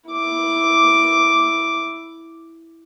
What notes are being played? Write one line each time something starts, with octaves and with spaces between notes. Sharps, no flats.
E4 D6